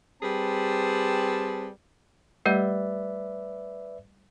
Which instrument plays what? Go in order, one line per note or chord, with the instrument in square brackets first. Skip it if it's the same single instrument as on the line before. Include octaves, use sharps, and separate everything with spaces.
[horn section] G3 C4 G#4 B4 A5
[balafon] G3 A3 G4 [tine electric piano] B4 D5 E5